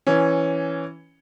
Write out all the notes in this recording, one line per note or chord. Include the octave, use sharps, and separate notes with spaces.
E3 C#4